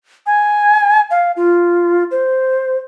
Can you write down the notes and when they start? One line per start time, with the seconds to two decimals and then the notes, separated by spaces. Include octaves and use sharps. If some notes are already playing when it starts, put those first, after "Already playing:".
0.26 G#5
1.11 F5
1.36 F4
2.11 C5